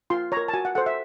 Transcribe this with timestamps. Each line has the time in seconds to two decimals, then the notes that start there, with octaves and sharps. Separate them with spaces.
0.10 F4 C6
0.32 C#5 A#5
0.37 A#4
0.48 A5
0.54 F#4 G#5
0.65 F#5
0.75 A4 C5 F#5
0.86 E5